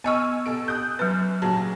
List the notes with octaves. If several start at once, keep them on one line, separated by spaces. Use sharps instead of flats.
B3 D#5 G#5 C#6 E6 F6
B2 A4 D7
D#6 F#6 G6
F#2 F#3 B4
A#2 C#3 F#3 A5